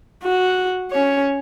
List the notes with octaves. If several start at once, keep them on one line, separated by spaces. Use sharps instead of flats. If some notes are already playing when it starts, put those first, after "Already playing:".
F#4
C#4 C#5